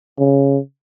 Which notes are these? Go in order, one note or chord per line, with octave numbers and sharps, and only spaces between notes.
C#3